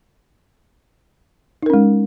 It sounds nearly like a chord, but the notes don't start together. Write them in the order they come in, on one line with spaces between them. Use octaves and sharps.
D#4 A#4 C#4 G#3